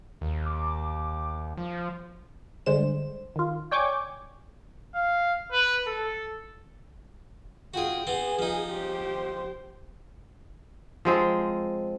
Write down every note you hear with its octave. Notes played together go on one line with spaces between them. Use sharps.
D#2
D6
F3
G1 G2 D3 G#3 C5 E7
D#3 F4
C#5 D5 G5 G#5 C#6 D6
F5
B4
A4
F4 F#4 G#4 G5
B3 C4 G#4
F3 D#4
G4 C5
F3 G#3 C4